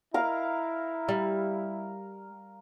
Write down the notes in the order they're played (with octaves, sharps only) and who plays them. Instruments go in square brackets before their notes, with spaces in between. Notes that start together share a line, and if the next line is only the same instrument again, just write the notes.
[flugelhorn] E4 [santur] A#4 F5
[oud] G3